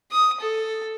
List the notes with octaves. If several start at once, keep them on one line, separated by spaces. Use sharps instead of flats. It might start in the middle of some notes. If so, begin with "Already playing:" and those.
D#6
A4